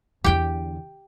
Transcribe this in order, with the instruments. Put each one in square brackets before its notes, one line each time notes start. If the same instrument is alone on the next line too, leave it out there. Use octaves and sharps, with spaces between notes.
[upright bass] E2 D3 [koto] G4 G5